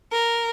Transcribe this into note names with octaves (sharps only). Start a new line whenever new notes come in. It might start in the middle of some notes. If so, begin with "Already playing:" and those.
A#4